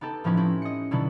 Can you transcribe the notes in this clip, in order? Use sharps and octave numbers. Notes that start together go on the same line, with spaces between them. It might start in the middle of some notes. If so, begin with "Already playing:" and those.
B3 D#4 G4 A4
A2 F3 B3 C#4 D#4 E4
C4 C#4 E4
D#5 C#7
B2 D3 F#3 D#4 E4